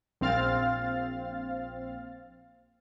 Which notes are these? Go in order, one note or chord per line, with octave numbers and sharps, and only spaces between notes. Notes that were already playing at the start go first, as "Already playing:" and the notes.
A#1 C4 F5 F6 A6